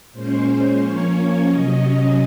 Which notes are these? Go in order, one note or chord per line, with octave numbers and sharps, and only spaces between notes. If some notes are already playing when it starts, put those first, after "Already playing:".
A#2 G#3 C#4 C5
F3 A#3 C#4 C#5
C3 F#3 C#4 D#5